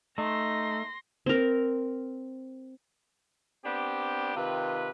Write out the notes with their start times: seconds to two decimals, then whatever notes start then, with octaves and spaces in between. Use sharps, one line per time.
0.18 A3 D#4 C6 A#6
1.26 C4 A#4
3.65 B3 C4 D4 G4
4.36 C3 D#3 F4 B4